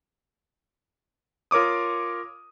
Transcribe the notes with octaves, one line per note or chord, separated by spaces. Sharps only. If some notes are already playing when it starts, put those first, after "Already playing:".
F4 A#4 C#5 D6 D#6